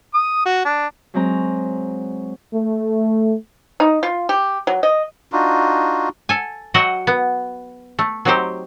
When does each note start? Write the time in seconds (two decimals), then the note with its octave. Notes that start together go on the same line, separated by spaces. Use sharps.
0.14 D#6
0.45 F#4
0.65 D4
1.14 F#3 G#3 C4 A#5
2.53 A3
3.80 D#4
4.03 F4
4.29 G4
4.67 F#3
4.83 D#5
5.32 D4 D#4 F4 F#4
6.29 A4 G#5
6.74 F#3 F#4 D#5 E5 F#5 G5
7.07 B3
7.99 A3
8.25 F#3 C4 D#4 G4 C5